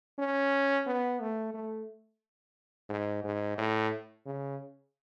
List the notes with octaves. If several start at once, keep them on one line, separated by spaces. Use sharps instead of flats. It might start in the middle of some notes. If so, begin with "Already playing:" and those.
C#4
B3
A3
A3
G#2
G#2
A2
C#3